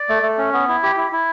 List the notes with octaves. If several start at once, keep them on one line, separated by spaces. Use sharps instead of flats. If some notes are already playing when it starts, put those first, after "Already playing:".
Already playing: D5
A3
A3
C#4
B3
E4
G4
E4
E4